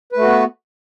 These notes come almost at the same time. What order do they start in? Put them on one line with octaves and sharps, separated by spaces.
B4 A3 F#4 B3